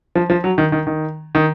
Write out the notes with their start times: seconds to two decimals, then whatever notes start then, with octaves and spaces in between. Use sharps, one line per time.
0.15 F3
0.30 F3
0.44 F#3
0.58 D#3
0.72 D#3
0.87 D#3
1.35 D#3